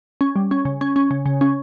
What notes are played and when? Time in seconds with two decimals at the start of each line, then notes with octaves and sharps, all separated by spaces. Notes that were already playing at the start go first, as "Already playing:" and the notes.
0.21 C#4
0.36 G3
0.51 C#4
0.65 C#3
0.81 C#4
0.96 C#4
1.11 C#3
1.26 C#3
1.41 C#4